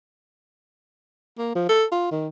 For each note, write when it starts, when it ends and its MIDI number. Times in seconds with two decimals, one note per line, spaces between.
1.38 1.52 58
1.55 1.67 53
1.69 1.85 69
1.92 2.10 65
2.11 2.28 51